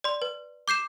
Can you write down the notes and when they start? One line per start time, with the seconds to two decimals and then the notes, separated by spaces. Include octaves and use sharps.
0.04 D5 C6
0.22 B4
0.68 D6 G6 C7 E7